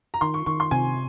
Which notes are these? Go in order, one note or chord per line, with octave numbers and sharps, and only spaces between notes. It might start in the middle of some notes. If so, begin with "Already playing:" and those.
A#5
D#3 C6
C#6
D#3 C#6
C6
C3 G#5